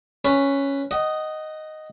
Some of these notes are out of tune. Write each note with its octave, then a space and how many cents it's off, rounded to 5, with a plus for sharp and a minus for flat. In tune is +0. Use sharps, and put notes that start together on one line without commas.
C#4 +0 B4 +5
D#5 +0 F#5 +30